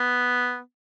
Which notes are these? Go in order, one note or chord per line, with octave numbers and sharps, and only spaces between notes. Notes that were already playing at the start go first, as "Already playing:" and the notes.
Already playing: B3